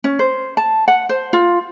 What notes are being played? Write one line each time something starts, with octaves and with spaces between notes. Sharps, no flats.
C#4
C5
A5
F#5
C5
F4